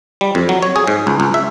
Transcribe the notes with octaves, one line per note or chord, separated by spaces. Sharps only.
G3
F2
F#3
C#5
G#4
G#2
C#2
C#2
E5